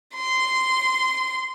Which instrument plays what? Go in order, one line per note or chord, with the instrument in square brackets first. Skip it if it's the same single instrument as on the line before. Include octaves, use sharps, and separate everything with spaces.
[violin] C6